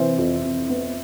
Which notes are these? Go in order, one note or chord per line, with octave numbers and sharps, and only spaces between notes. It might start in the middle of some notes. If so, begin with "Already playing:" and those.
Already playing: C3 E3 C5 E5
F2
F2
B3